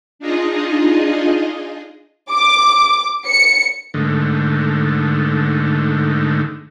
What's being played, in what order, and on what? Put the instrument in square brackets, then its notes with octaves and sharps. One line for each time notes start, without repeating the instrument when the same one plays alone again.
[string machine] D4 D#4 F4 G#4 D#5
[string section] D6
C#7
[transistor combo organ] G#2 D3 D#3 A3